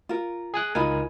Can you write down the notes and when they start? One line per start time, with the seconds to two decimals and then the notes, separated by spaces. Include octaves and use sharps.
0.09 F4 A#4
0.54 G#4 G#5 F#6
0.75 C#2 D#4 F4 A#4 G#5 B5